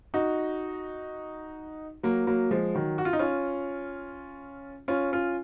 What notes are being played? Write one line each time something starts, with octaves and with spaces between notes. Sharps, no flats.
D#4 F#4
F#3 A#3
F#3 A#3
F3 G#3
D#3 F#3
F#4
F4
D#4
C#4 F4
C#4 F4
C#4 F4